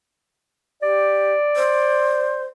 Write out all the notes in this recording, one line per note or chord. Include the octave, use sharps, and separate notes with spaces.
G4 D5
C5